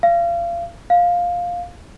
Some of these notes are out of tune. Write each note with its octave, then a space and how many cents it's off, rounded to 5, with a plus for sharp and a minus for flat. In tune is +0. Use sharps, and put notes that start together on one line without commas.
F5 -30
F5 +10